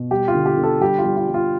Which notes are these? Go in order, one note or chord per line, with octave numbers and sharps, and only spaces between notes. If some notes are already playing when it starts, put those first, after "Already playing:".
Already playing: B2
G3 G4
F4
D3
G4
D3
A4
G3 G4
F4
G3
F4
G3
F4